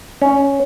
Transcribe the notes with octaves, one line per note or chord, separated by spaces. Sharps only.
C#4